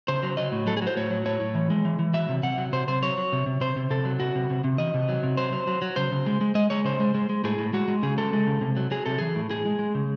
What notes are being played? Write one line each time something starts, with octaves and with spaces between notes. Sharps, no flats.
C#3 C5
F#3
F#3 D#5
A2
F#3 A4
G#4
F#3
C5
A2 C#5
F#3
A2 C#5
A2
E3
G#3
E3
E3
F#3 E5
C3
C3 F#5
F#3
C3 C5
C3 C5
F#3 C#5
F#3
C3
C3
C3 C5
C3
C3 A4
F#3
C3 F#4
C3
C3
C3
E3 D#5
C3
F#3
C3
F#3 C5
F#3
F#3
F#3
C#3 C5
C#3
G#3
G#3
G#3 D#5
G#3 C#5
C#3 C5
G#3
G#3
G#3
A2 G#4
A2
G#3 F#4
G#3
C#3 G#4
G#3 A4
G#3
C#3
C3
F#3
F#3 G#4
C3 A4
E3 G#4
A2
A2 G#4
G#3
G#3
C#3